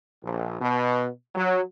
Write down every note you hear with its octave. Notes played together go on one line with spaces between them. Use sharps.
A#1
B2
F#3